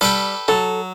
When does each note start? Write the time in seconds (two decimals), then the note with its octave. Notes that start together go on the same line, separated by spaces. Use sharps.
0.01 G3 A4 B4 G5
0.48 F#3 A4